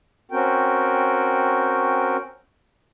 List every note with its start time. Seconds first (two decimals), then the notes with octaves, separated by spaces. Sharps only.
0.31 C4 C#4 F#4 A#4 G5